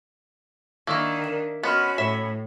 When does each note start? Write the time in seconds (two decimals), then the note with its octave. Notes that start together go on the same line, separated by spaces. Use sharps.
0.87 D#3 A#3 D4 E4 C#6 E6
1.24 A#4 E7
1.63 B3 C#4 F#4 C#5 D#5 B5 C6 F6
1.98 A2 E5